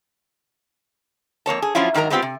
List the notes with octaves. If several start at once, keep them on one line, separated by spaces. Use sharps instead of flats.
F2 A#3 C#5 A5
G#4
F3 F#3 C#4 E4 F4
G#2 D#3 F#3 A#4 A#5
G#3 A3 B3 C4 F4 G4
C3